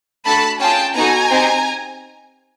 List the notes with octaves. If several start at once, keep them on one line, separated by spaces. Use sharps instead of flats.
A3 D4 F#4 A4 A5 B5
C#4 F4 G#4 G5 A5
B3 D#4 F#4 A4 G#5 A#5
C4 D#4 G4